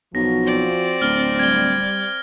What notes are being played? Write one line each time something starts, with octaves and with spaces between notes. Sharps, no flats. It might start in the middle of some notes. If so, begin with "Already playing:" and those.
B1 F3 F#4 A#6
C4 D5
D1 F6 G7
G3 G#6 G7